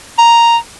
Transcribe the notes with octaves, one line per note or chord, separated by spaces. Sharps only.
A#5